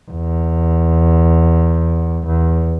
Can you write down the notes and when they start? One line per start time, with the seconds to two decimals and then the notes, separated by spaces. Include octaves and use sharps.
0.11 E2
2.27 E2